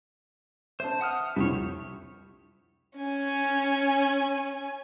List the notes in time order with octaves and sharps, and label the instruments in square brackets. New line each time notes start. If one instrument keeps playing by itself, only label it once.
[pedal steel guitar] C5 [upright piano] E5 A5
[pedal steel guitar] F#5 D#6 F6
[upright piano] C2 F2 [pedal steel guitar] G3 C4 C#5
[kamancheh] C#4 G#5